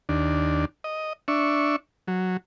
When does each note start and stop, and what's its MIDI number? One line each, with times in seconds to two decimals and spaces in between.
0.09 0.65 39
0.09 0.65 62
0.84 1.13 75
1.28 1.76 62
1.28 1.76 76
1.28 1.76 85
2.08 2.37 54